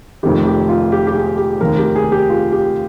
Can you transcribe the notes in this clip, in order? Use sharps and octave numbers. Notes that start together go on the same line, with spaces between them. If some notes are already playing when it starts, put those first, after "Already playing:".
F1 F2 D#3 G4
G4
F4
G4
G4
G#4
G4
F1 D#2 D#3 A#4
G4
G#4
G4
F4
G4